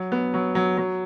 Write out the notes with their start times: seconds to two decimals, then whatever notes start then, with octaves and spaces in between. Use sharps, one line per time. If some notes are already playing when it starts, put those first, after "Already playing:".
Already playing: F#3
0.12 B3
0.34 F#3
0.55 F#3
0.78 F#3